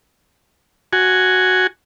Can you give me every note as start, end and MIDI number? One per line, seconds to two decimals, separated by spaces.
0.93 1.67 66
0.93 1.67 80